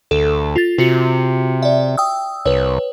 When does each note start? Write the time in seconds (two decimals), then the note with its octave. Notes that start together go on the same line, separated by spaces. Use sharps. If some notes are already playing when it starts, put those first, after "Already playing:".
0.11 D2 A4
0.56 F4 A6
0.78 C3 F4 F#4 C#7
1.63 D5 E5
1.97 G5 D#6 E6
2.46 C2 B4 C#5